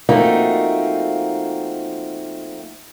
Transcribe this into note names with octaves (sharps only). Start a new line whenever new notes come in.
F3 A3 A#3 C4 D#4 F#4